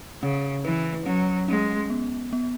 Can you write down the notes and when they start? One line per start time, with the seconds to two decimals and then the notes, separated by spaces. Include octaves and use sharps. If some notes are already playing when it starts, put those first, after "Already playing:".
0.22 C#3 C#4
0.64 E3 B4
1.06 F#3 C#4
1.48 G#3 C#4
1.90 B3
2.33 B3